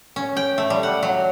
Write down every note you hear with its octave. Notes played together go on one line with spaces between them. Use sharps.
C#4
G5
A3
G3
F#5
F#3